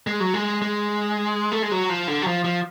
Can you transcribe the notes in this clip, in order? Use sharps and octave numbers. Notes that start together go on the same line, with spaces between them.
G#3
F#3
G#3
G#3
A3
G#3
F#3
F3
D3
F#3
F3
F3